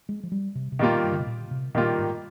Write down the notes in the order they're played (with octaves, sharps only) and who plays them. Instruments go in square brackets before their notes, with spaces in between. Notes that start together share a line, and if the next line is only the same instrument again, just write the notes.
[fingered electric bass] G#3
F3
G3
C3
C3
[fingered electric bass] A#2 [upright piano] D#3 G3 A#3 F4
[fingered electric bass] G2
D3
C3
A#2
C3
[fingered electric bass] A#2 [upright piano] D#3 G3 A#3 F4
[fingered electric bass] G#2